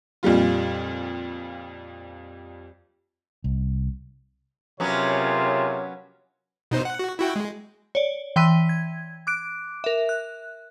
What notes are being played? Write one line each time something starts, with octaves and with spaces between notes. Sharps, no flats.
F2 A#2 G3 F4
C2
C3 F#3 B3 C#4 F4 G#4 A#4 C#5
B2 D#4 C5
F#5
F#4
E4 F#4 G5
G#3
C#5 D5
E3 G5 C6 E6 B6 D#7
G#6
D6 F#6 D7
A#4 E5
F#6